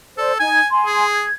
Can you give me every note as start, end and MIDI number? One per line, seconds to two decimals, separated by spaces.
0.18 0.36 69
0.18 0.32 72
0.18 0.32 74
0.40 0.59 63
0.40 0.69 80
0.40 0.59 92
0.70 1.05 80
0.70 1.05 84
0.86 1.25 68
1.14 1.36 92